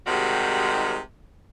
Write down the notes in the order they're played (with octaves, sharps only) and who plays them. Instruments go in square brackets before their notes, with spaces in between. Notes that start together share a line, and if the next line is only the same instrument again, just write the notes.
[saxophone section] G#2 C3 D#3 G3 F#4